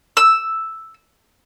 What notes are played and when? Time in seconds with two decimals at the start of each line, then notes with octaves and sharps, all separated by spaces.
0.17 E6